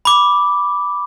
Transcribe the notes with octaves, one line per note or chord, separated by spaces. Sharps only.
B5 D6